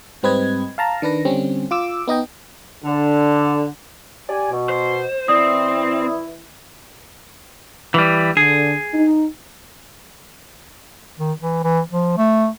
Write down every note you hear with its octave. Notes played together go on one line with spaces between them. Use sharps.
G#2 G3 C4 B4 D#5 G#6
F5 A5 A#5
D#3 D4 B4 A#6
D3 G3 C4 C#4
F4 D6 E6
B3 D#4 D#5 G5
D3
G4 D5 G#5
B2
C5
E3 C4 E4 D5 D#6
E3 G3
D3 G#4
D#4
D#3
E3
E3
F3
A3